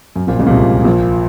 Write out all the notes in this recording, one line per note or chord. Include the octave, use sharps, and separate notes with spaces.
F#2
A#1 A#2
C#2 C#3
A#2
C2 C3
A#1 A#2